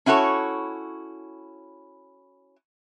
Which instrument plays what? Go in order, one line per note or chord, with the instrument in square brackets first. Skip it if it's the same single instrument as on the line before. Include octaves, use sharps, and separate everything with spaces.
[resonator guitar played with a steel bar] C#4 E4 F#4 A4 C#5